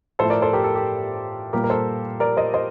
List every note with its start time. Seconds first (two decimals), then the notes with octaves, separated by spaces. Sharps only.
0.19 A2 F3 A3 A4 C5
0.30 A#4 D5
0.42 A4 C5
0.53 G4 A#4
0.64 A4
0.75 G4
1.53 A#2 G3 A#3 G4 A#4
1.64 A#4
1.70 A4 C5
2.20 A#4 D5
2.37 C5 D#5
2.54 C5 D#5